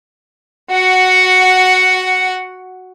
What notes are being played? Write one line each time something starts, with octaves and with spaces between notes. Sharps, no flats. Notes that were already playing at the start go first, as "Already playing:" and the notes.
F#4 F#5